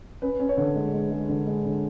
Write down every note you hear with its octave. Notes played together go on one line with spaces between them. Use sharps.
C#4 B4
C#4
C#5
D3
G#3
G#3
G#3
D3
G#3
D3